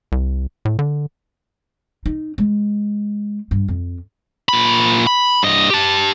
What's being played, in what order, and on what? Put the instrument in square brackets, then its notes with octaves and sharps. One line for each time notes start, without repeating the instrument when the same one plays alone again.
[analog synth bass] C2
A2
D3
[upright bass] D#4
G#3
G2
F2
[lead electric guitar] A#2 B5
B5
G2 D#5
G4 A5